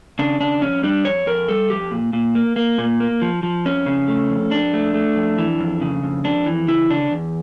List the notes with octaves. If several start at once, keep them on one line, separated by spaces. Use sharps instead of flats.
C#3 D4
C#3 D4
F2 C#4
G3 D4
F2 C#5
F2 A#4
G3 A4
F2 G4
A#2
A#2
A#3
A#3
A#2
A#3
F3
F3
F2 C#4
C#3
A3
F2
F2 D4
A3
A3
F2
E3
F2
C#3
F2
F2 D4
E3
C#3 E4
C#3 D4
E2